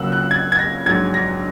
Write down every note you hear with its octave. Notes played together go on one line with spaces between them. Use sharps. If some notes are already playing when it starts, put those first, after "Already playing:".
Already playing: C#2 C#3 F#3 A#3 E6 F#6
F#6
G#6
G#6
A#6
A#1 G#2 F#3 G#6
A#6